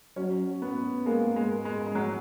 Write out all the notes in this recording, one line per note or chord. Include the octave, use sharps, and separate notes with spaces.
F#3 C#4
B3
G#3 A#3
G#3
G#3
G#3
F#3